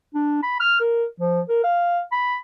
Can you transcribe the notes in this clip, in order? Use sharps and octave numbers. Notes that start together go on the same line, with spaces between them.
D4
B5
F6
A#4
F3
A#4
F5
B5